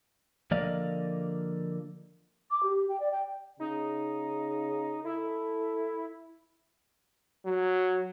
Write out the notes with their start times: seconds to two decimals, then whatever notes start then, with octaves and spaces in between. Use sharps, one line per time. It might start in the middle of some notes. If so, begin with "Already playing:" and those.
0.51 D3 F3 A#3 D5 D#5 F5
2.51 D6
2.63 G4
2.89 G5
3.00 D5
3.12 G5
3.60 C#3 D#4
5.05 E4 A4
7.45 F#3